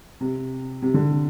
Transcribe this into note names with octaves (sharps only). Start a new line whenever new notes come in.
C3
C3
D3